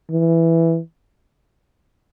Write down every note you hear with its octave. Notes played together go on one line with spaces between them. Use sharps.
E3